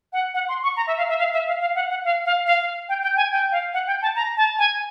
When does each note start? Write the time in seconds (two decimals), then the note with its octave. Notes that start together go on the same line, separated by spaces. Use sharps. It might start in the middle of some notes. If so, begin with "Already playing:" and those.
0.13 F#5
0.34 F#5
0.48 C6
0.63 C#6
0.77 A#5
0.87 E5
0.98 F5
1.09 E5
1.19 F5
1.33 E5
1.47 F5
1.61 F5
1.75 F#5
1.90 F#5
2.04 F5
2.25 F5
2.46 F5
2.89 G5
3.03 G5
3.17 G#5
3.32 G5
3.52 F5
3.74 F#5
3.87 G5
4.02 A5
4.16 A#5
4.37 A5
4.58 G#5